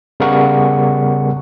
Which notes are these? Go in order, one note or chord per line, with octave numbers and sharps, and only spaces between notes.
C#3 G3 B3 A#4 F#5 C#6